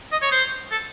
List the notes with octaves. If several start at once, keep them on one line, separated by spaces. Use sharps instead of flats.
D#5
C#5
C5
A4